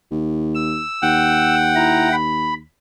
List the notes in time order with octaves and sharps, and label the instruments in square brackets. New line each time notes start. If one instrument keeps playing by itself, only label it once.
[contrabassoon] D#2
[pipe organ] E6
[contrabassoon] D#2 [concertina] F#5 G5
[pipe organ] E4 A#5
B5